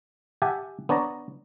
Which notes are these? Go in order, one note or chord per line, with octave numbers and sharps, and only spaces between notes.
G4 E5 F#5 G#5 A5
B3 D4 C#5 A5 A#5